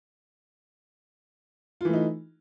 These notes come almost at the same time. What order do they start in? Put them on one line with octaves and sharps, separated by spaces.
F4 E3 A3 D#4